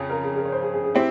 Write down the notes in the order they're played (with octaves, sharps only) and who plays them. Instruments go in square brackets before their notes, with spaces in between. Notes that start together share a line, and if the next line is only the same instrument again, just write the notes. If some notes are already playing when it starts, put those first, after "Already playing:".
Already playing: [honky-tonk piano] F2 C#3
[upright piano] A#4
G#4
G#4
A#4
C#5
C5
G#4
G#4
G#4
[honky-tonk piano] C4 E4 [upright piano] G4